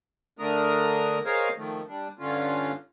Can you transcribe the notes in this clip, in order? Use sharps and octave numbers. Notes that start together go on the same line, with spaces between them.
D3 A3 D4 A#4 A#5 D#6
G#4 A#4 C5 C#5 D#5 F5
D#3 F3 A3
G3 D4
G2 D3 C#4 F4